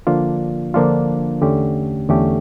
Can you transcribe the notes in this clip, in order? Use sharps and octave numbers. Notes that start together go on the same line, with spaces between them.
D3 F3 A#3 D4 F4
D3 F3 A#3 D4 F4
E2 D3 A3 C#4 G4
E2 D3 A3 C#4 G4